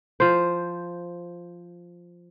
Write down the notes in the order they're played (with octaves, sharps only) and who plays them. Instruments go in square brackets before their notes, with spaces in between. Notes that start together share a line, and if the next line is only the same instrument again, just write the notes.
[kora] F3 C5